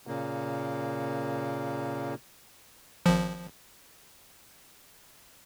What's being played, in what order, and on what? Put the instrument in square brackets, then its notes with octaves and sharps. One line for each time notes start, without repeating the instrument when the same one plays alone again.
[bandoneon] A#2 C#3 A#3
[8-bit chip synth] G#1 F3